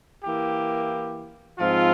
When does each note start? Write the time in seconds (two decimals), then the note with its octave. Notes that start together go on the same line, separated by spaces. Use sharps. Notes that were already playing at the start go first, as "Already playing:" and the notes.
0.24 E3 A#3 E4 G4
1.59 G#2 F3 C4 F4